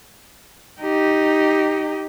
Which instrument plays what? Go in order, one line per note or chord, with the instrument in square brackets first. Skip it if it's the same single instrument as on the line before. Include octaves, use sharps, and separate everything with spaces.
[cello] D#4 G4